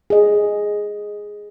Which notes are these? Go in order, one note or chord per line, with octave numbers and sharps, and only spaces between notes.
G#4 D#5